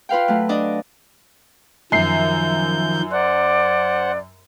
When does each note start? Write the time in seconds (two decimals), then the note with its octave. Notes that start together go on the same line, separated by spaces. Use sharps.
0.09 F4 B4 F5 G5
0.28 F#3 A3
0.49 D4 D5 D#5
1.92 F#2 D#3 F3 G6 C7
3.11 C5 D5 F#5